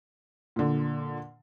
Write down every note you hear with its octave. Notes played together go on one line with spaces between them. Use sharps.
A#2 D3